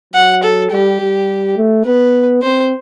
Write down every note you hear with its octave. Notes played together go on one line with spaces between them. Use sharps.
F#3 F#5
A4
G3 G4
G3
A3
B3 B4
C4 C5